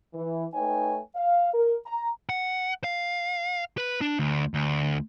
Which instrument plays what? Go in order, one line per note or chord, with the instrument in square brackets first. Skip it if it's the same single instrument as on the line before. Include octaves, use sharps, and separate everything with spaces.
[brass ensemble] E3
A3 D#4 B4 C#5 G5 G#5
F5
A#4
A#5
[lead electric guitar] F#5
F5
B4
D4
D2
D2